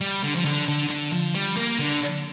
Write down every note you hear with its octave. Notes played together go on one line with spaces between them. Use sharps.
G3
D3
F3
D3
D3
D3
F3
G3
A#3
D3